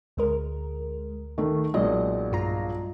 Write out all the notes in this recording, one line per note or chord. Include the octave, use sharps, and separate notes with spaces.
D2 G#3 A#4
D#3 A3
B1 A#2 G#3 D#5
G2 F4 A#5